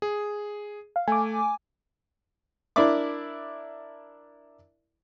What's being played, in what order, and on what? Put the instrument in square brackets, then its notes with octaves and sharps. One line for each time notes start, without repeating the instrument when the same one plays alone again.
[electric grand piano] G#4
[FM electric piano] F5
[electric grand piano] A3 [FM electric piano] G#5 D6
[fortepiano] D4 E4 A#4 D5 E5 D6